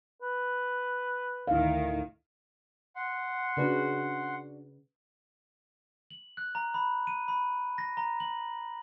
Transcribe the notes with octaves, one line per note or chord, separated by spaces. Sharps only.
B4
D2 A2 D#3 E4 F5
F#5 C6
C#3 D4 F#4 B4
F#7
F#6
A#5
B5
D#7
B5
A#6
A#5
F#7